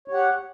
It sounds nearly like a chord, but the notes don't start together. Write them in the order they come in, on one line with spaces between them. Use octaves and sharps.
C#5 G4 F#5